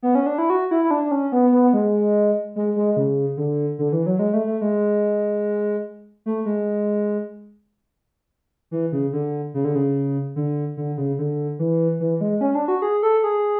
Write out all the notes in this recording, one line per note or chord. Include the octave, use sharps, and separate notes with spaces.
B3
C#4
D4
E4
F#4
E4
E4
D4
D4
C#4
B3
B3
G#3
G#3
G#3
C#3
D3
D3
E3
F#3
G#3
A3
A3
G#3
A3
G#3
E3
C#3
D3
C#3
D3
C#3
D3
D3
C#3
D3
E3
E3
G#3
C#4
D4
F#4
G#4
A4
G#4